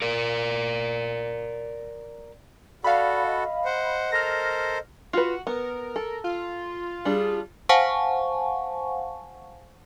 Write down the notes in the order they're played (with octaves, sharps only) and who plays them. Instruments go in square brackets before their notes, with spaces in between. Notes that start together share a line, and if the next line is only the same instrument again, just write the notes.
[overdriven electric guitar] A#4 D5
[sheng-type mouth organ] F#4 A4 [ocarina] D5 [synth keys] F5 B5
[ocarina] D#5
[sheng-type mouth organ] C5 F#5
[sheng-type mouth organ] A4 A#4 C5 [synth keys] F6 A#6
[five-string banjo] F4 B4 [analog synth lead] F#4
[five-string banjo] B3 [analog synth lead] A#4
[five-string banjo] A4
[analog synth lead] F4
[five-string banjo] G3 D4 [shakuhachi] G#4
[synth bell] C5 F5 F#5 G#5 A5 C#6